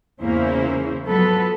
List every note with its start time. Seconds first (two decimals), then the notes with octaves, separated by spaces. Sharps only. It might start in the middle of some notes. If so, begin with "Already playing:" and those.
0.22 E2 C#3 A#3 C#4 E4 C5
1.07 F3 F#3 B3 A4 B4